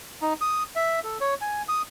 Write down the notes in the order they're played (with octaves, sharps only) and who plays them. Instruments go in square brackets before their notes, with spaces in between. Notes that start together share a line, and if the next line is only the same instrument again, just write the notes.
[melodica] D#4
D#6
E5
A4
C#5
G#5
D#6